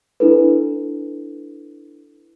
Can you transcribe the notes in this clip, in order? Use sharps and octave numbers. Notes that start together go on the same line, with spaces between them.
D4 E4 A4 B4